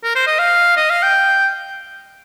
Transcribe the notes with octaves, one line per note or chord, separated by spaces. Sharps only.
A#4
C5
D#5
F5
D#5
F5
G5